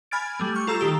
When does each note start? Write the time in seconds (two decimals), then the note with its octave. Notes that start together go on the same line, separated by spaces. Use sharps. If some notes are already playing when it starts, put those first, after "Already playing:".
0.11 G#5 B5 F6 G#6 A6 D7
0.40 G3 A3
0.54 C#6 F6 G6
0.67 F4 A4 A#5 E6
0.79 D#3 G4 E6